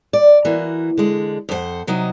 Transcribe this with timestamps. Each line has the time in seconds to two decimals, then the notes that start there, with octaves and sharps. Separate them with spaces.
0.13 D5
0.45 E3 A#3 F#4
0.97 D3 G#3
1.49 F2 D#4 F4 C5 F#5
1.87 C3 F#3 D#4 D#5